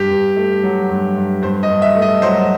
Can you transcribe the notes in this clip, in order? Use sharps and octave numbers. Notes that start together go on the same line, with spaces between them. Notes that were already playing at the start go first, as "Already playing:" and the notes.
Already playing: G2 G4
G2
A3
F#3
G2
G2
G2 C5
D#5
G2
E5
A3
D#5
F#3 C5